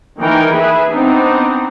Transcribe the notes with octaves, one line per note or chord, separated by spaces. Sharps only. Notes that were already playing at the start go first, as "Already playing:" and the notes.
D#3 E3 A#3 D#4 A#4 G5
G#4 B4 E5
B3 C4 D4 D#4